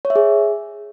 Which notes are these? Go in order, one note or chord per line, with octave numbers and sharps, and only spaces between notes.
C#5
E5
G#4